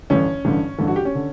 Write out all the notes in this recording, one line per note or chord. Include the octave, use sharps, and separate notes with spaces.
A1 G2 D3 C#4
A1 G2 D3
A1 G2 D3 A4
F#4
G4
C#4
D3